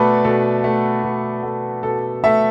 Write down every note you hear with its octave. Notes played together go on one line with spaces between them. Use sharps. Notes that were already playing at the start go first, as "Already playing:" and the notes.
Already playing: B2 A3 A4 B4 D5
B2 A4
A3
B2
A3
B2 A4
A3 E5